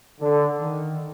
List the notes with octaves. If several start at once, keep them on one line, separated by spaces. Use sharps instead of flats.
D3
D#3